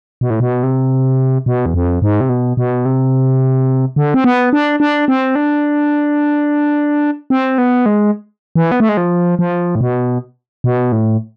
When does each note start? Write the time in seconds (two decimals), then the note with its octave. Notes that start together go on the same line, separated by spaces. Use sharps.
0.21 B2
0.30 A2
0.40 B2
0.63 C3
1.46 B2
1.66 E2
1.74 F2
2.02 G#2
2.21 C3
2.29 B2
2.57 B2
2.85 C3
3.96 D3
4.14 C4
4.24 B3
4.53 D4
4.80 D4
5.08 C4
5.35 D4
7.30 C4
7.58 B3
7.86 G#3
8.56 E3
8.72 B3
8.80 A3
8.89 G#3
8.97 F3
9.39 F3
9.75 A2
9.81 B2
10.64 B2
10.92 A2